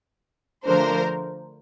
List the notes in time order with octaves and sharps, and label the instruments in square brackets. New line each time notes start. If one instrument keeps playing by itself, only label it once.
[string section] D3 F3 A3 D4 A#4 C5